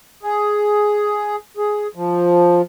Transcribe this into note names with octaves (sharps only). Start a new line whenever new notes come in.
G#4
G#4
F3